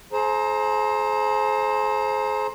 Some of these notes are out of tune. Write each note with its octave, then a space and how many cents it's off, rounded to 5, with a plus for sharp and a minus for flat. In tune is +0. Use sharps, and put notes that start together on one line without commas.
G#4 +40 C5 +10 A#5 +0